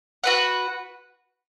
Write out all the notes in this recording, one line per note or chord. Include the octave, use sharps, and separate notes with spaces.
F#4 B4 F#5